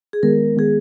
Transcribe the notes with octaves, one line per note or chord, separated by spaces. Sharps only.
G#4
D#3 G#3 B3 A#4
D#3 G#3 B3 G#4